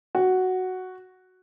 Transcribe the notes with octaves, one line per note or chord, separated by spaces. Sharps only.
F#4